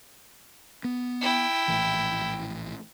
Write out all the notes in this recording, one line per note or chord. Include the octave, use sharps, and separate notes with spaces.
B3
E4 G5
A#1 A2 E3